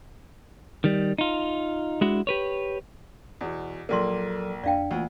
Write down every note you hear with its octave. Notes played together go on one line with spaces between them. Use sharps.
D#3 G3
D#4 F4
G#3 D4 E4 F#4
G4 B4 C#5
E2 B2
A#1 F#3 A#3 A4 A#4 D5 C6
F2 D4 D5 F5 G5
D2 E3 A#3 F4